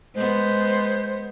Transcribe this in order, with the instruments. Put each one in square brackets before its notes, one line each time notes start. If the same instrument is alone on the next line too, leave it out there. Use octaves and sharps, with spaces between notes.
[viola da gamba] G#3 B3 [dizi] C5